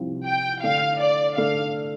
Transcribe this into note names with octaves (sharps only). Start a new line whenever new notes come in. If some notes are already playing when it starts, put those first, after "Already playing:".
Already playing: C2 C3 F3 C4 F4
G5
D3 A3 D4 F5
D5
D3 A3 D4 F5